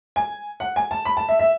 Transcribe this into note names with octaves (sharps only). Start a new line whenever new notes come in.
G#5
F#5
G#5
A5
B5
A5
E5
E5